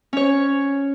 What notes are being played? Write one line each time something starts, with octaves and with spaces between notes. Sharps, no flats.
C#4 C#5